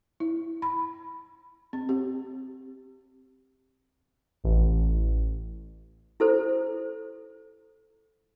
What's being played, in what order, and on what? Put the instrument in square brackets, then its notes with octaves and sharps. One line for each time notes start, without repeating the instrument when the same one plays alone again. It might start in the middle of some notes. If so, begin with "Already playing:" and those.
[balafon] E4
B5
C4
G4
[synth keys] A1
[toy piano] E4 A4 C5